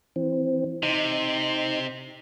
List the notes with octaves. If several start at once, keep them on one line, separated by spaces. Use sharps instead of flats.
E3 C4
C3 D#4 C6